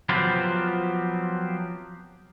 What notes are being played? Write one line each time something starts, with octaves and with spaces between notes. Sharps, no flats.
F3 F#3 B3 C4 F4 G4